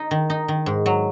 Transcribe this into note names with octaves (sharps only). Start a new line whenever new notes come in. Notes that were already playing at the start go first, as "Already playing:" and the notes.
Already playing: D#4
D#3
D#4
D#3
G#2
F#3